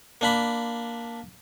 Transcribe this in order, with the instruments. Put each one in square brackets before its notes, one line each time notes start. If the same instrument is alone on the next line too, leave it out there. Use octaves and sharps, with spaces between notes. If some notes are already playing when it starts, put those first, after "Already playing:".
[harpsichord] A#3 D4 B5